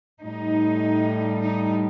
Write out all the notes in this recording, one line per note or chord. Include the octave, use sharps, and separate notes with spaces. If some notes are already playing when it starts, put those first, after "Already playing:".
A2 G3 D#4
D#4